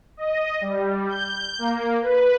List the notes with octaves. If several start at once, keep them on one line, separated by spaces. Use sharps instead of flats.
D#5
G3
G6
A#3
B4